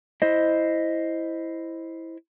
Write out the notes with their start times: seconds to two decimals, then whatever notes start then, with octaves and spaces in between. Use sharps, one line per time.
0.22 E4 C5 D#5